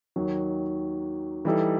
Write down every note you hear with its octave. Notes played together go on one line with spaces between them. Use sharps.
D#2 D#3 F#3
E3 G3 D#4 A4